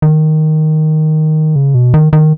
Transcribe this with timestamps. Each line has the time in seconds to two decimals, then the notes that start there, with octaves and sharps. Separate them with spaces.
0.02 D#3
1.56 C#3
1.74 B2
1.94 D#3
2.13 D#3